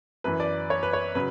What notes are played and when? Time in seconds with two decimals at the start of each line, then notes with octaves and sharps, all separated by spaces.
0.24 F#2 E3 B4
0.40 D5
0.70 C#5
0.83 B4
0.93 C#5
1.15 C#3 F#3 B4